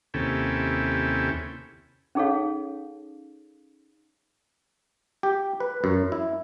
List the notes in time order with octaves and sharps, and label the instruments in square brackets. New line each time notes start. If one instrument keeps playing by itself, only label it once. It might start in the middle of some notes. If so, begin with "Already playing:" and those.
[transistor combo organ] D#2 C3 C#4 E4 A4 G5
[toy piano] C#4 D#4 G#4 A4 C#5 F5
[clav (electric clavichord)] G4
B4
F#2
E4